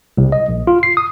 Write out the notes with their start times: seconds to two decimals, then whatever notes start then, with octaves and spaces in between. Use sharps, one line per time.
0.17 C2
0.32 D#5
0.49 A#1
0.67 F4
0.83 C7
0.97 D#6